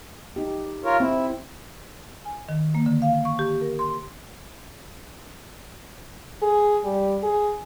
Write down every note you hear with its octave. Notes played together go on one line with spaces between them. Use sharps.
D#4 G4
F4 A#4 C#5
C4 E4
G#5
D#3
A#3
D3
F5
C#6
G4
A#4
C6
G#4
G3
G#4